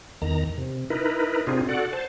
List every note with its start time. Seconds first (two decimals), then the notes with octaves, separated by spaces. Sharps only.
0.22 E2 D#3 A#5
0.58 C3
0.90 D#4 E4 A#4 B4
1.47 C3 C4 D4 D#4 F4 G#4
1.69 F#4 A4 D5 F#5
1.93 C5 A5